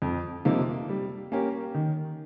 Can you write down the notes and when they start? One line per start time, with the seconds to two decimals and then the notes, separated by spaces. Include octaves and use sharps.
0.02 F2
0.45 C3 F3 A#3 D#4
0.89 G3
1.32 A#3 C#4 G4 A#4
1.74 D#3